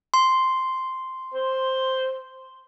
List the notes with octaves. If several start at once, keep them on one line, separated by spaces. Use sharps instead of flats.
C6
C5